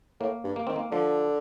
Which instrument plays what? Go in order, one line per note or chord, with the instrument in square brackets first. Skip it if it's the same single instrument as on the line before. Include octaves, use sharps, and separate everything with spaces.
[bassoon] A2 [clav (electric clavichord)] A#3
[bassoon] G2
[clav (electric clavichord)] A#3
[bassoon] D#3 [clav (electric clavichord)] C4
[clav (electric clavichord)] A#3
[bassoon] D3 [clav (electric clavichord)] F3